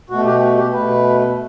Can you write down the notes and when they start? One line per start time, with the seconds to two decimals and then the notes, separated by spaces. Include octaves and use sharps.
0.10 B2 A3 F#4
0.25 G4
0.41 F#4
0.57 G4
0.73 B2 A3 B4